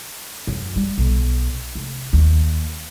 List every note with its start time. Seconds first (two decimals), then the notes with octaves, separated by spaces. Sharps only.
0.47 F#2
0.76 G3
0.98 B1
1.75 F1
2.13 D#2